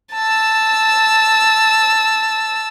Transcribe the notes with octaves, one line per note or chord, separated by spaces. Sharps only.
A5 E6